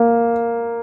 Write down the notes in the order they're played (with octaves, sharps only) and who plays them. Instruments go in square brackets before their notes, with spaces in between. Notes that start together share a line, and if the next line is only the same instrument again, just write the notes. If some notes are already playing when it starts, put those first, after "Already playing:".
Already playing: [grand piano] A#3